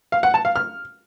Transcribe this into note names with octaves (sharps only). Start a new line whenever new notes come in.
F5
F#5
A5
F5
F6